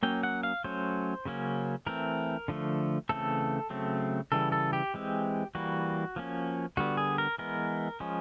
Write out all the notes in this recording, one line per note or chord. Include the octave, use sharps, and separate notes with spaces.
F#3 A#3 C#4 G5
F#5
F5
F#3 A3 C#4 C5
C#3 F#3 A#3 C#4
E3 A3 C4 A#4
D3 F3 A3
C#3 E3 A3 C4 A4
C#3 F#3 A3 C4
C#3 E3 G3 A4
A4
G4
E3 G#3 C4
E3 G3 A#3 F#4
F3 A#3 C#4
D3 G3 B3 F#4
G#4
A#4
E3 G#3 B3 A#4
F3 G#3 C#4